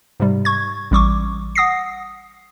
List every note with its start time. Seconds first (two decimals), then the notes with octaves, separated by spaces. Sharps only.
0.20 G#2 C3 G3
0.45 C#6 G#6
0.91 A1 G3 C#6 D6
1.55 F#5 D#6 A#6 C7